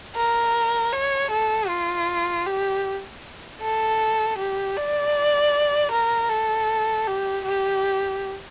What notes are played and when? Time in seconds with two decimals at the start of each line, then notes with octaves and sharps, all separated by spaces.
0.16 A#4
0.92 C#5
1.31 A4
1.68 F4
2.46 G4
3.61 A4
4.38 G4
4.76 D5
5.92 A#4
6.29 A4
7.07 G4
7.45 G4